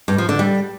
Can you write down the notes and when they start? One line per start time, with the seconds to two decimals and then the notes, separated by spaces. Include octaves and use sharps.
0.08 G2
0.18 F3
0.29 D3
0.39 G3